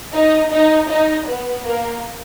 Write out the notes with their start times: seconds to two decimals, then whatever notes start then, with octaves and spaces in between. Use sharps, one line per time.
0.13 D#4 D#5
0.51 D#4 D#5
0.88 D#4 D#5
1.26 B3 B4
1.64 A#3 A#4